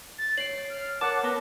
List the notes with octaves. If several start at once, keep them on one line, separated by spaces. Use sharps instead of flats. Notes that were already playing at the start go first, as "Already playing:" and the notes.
A6
C#5 C7 D7 F#7
F6
A#4 C#5 F#5 A5 D6
B3 A5 A#6